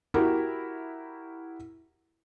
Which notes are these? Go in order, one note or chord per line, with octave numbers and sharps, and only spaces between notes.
E4 F#4 G4 A#4